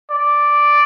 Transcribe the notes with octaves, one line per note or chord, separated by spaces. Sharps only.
D5